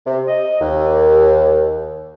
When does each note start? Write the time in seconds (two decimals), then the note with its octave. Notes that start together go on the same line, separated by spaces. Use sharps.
0.06 C3
0.27 D#5
0.61 D#2